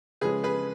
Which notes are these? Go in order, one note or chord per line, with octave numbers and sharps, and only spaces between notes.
C#3 F3 G#3 C#4 G#4 B4
G#4 B4